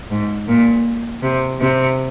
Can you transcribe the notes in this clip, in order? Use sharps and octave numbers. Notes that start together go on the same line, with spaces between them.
G#2
A#2
C3
C3